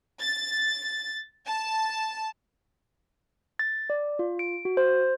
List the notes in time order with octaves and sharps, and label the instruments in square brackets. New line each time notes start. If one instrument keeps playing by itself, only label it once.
[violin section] A6
A5
[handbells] A6
D5
F4
D7
F#4
C5